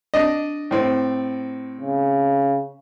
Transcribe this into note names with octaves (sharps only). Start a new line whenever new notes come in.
D4 D#5
A2 C4
C#3